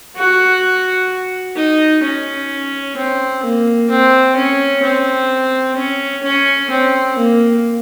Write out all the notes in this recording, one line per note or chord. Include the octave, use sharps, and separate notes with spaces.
F#4
D#4
C#4
C4
A#3
C4
C#4
C4
C#4
C#4
C4
A#3